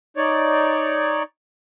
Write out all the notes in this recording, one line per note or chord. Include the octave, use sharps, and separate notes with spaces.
D#4 C#5 D5